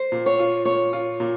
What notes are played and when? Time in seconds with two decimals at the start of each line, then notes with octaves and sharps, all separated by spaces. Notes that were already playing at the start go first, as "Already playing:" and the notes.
Already playing: C5
0.12 A#2
0.26 C#5
0.39 F4
0.65 A#2 C#5
0.93 F4
1.20 A#2